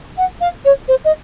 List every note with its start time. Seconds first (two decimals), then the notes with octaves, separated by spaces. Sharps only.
0.17 F#5
0.41 F5
0.65 C#5
0.88 C5
1.04 D#5